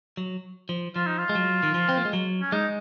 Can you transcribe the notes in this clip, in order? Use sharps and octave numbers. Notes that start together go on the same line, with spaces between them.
F#3
F3
F3 F4
D#4
F4
G#3
F#3
D#3
F3
C4
A#3
G#3
F#3
C#4
G#3 D#4